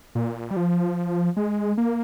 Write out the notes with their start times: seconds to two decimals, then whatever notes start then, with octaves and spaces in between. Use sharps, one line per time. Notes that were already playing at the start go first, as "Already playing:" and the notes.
0.15 A#2
0.51 G3
0.56 F3
1.37 G#3
1.78 A#3